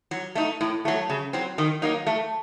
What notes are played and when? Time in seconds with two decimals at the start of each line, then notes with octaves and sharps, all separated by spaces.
0.11 F#3
0.35 A3 D#4
0.61 A2
0.85 F#3 A3
1.10 C#3
1.33 F#3 C4
1.58 D#3
1.82 F#3 A#3 D#4
2.07 A3